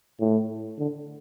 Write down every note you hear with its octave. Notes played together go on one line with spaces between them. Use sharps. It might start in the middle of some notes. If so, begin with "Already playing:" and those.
A2
D3